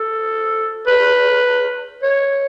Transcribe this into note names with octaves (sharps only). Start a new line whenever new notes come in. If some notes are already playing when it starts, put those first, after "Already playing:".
Already playing: A4
B4
C#5